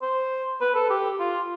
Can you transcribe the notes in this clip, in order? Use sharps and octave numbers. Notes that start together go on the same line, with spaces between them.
C5
B4
A4
G4
F4